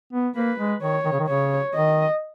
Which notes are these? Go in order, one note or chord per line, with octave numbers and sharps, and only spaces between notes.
B3
A#3 B4
G#3
D#3 C#5
D#3
C#3
D#3
C#3 C#5
D#3 D#5